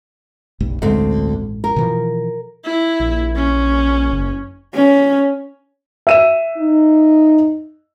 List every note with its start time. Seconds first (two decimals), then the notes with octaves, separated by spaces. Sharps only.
0.60 F1 B1 G2
0.82 A1 D2 G2 G#3 C4
1.64 A#4
1.76 B2 E3 F3
2.65 E4
3.00 A#1
3.36 C#4
4.12 F#1
4.74 C#4
6.07 E5 D#7 E7
6.57 D#4